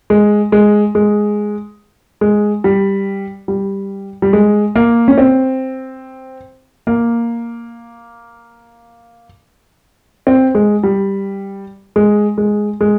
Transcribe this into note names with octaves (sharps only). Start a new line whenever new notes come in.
G#3
G#3
G#3
G#3
G3
G3
G3
G#3
A#3
C#4
C4
A#3
C4
G#3
G3
G#3
G#3
G#3